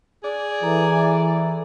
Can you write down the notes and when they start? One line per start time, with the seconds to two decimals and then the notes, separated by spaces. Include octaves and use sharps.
0.23 G#4 D5
0.63 E3 A4 A#5